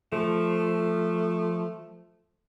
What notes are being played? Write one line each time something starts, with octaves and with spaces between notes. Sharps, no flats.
F3 A3